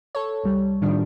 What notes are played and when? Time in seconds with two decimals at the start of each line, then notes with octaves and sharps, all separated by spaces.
0.15 A4 C#5
0.44 C2 G3
0.82 A2 D#3 F3 G3 D4